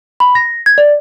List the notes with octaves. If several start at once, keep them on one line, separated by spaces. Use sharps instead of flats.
B5
A#6
G#6
D5